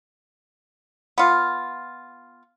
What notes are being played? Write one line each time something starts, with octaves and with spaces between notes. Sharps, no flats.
B3 F4